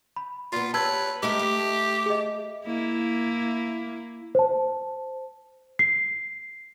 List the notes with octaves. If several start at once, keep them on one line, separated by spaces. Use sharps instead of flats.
B5
A#2 B3 F4
G4 B4 C#5 A5 E6 G#6
G#3 A3 G4 A#4
A3
G#4 D#5
A#3 E4
C5 A5
C7